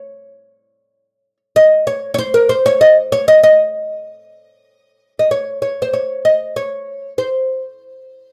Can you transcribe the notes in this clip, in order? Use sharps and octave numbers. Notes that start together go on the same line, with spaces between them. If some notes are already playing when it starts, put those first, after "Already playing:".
Already playing: C#5
D#5
C#5
C#5
C5
A#4
C5
C#5
D#5
C#5
D#5
D#5
D#5
C#5
C#5
C5
C#5
D#5
C#5
C5